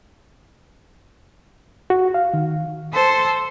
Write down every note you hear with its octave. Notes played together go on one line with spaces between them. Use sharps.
F#4
F5
D#3
A4 C5